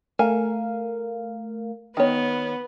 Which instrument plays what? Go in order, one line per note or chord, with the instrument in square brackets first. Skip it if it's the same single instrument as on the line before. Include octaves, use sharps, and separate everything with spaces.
[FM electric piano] A3 A#4 F5 [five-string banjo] G#5
[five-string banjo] D#3 C#5 [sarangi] B3